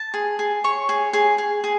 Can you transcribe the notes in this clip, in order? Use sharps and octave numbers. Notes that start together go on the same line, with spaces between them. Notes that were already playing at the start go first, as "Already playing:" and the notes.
Already playing: A5
G#4
G#4
C#5 C#6
G#4
G#4
G#4
G#4